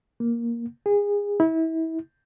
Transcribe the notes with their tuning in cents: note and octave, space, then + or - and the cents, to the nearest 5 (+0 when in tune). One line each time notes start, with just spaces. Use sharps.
A#3 +10
G#4 -25
E4 -30